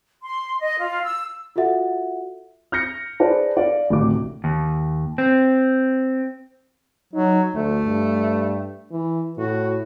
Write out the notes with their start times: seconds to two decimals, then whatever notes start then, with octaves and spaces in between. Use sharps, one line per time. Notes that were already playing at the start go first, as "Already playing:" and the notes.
0.23 C6
0.60 D#5
0.79 F4
1.03 E6
1.56 F4 F#4 A4 E5 F#5
2.72 F6 G6 A#6 C#7
3.20 G#4 B4 C5 D5 A5
3.57 D5 F5
3.90 A1 D2 C3 D#3 D6
4.44 D#2
5.18 C4
7.13 F#3 D#4
7.54 D2 A3
7.85 G2
8.92 E3
9.38 A2 F#4